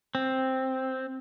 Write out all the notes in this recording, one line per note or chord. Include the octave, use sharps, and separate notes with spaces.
C4